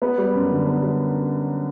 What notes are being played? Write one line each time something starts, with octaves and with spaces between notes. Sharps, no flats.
B3
G3
F#2
D3
B3
G3